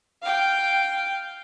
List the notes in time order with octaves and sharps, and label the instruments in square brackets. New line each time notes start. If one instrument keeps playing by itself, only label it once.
[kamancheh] F5 G5